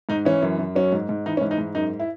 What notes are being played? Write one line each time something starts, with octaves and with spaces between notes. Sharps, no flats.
G#2 D#4
E3 C#4
F#2
F#2
F#3 C#4
G#2
G#2
E3 D#4
C#4
G#2
D#4
G#2
F#2 D#4
E4